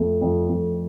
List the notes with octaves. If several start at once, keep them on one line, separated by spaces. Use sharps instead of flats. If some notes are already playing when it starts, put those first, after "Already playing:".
Already playing: F2 A3
F2
F2